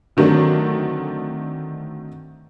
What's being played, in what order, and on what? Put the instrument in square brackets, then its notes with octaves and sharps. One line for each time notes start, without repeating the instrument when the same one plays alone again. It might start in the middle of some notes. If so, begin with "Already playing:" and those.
[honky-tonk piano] D3 D#3 F#3 A3 C4 D4